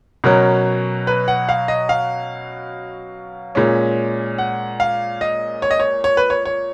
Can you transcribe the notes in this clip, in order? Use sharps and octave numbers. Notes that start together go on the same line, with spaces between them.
B2 F#3 C#4 A#4
B4
F#5
F5
D#5
F5
A#2 G#3 C#4
F#5
F5
D#5
C#5
D#5
C#5
C#5
B4
C#5
C#5